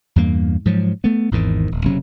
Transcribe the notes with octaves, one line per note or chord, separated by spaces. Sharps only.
E2 G2 A#3
G#2 F3 F#3
A3 B3
G#1 E2 G#2 D#3
D#1
F#1 C3 F#3 C#4